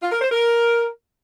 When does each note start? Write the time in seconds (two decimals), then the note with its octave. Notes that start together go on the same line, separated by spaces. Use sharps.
0.02 F4
0.12 A#4
0.22 C5
0.31 A#4